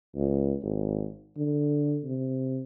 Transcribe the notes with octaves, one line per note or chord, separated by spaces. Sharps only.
C#2
G#1
D3
C3